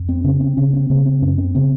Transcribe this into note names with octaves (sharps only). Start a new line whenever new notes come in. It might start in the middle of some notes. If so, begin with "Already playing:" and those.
Already playing: F2
C4
C#3 C#4
C4
C#3 C#4
C4
C#3 A#3
C4
F#2 C#4
C4
C#3 C4